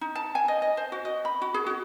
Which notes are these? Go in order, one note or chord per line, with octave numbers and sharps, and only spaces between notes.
D#4
A5
G#5
D#5
D#5
C5
F#4
D#5
B5
F#4
G#4
F#4